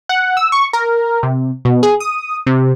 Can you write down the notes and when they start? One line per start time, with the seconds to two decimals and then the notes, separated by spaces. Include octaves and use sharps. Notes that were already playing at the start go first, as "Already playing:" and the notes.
0.09 F#5
0.37 E6
0.52 C#6
0.73 A#4
1.23 C3
1.65 B2
1.83 G#4
2.00 D#6
2.47 C3